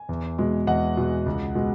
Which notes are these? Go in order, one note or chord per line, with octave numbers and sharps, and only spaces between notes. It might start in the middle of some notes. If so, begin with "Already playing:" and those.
Already playing: G#5
E2
B2 G#3
E2 D#5 F#5
B2 G#3
C#2
B2 G#3